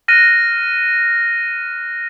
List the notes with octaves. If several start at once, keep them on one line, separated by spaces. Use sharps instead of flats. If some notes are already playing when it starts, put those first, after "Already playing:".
F6 F#6 A#6 D#7